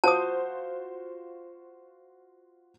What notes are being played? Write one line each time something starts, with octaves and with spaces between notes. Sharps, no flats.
F4 F#4 C5 A5 D#6